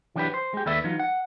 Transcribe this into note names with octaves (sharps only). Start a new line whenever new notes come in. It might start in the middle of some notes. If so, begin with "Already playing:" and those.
E3 F#3 D4 F#4 G4 B4
C5
G#3 G4
D#2 A4 B4 D5 E5
E3 F#3 D#4 F4
F#5